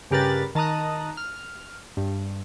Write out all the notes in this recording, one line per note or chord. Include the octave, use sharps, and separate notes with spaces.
G2 C#3 G4 A#4 B4 A6
D#3 A5 A#5 D#6 F#6
F6
G2